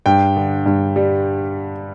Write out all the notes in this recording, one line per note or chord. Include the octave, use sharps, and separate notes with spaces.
G2 G5
D3
G2
G3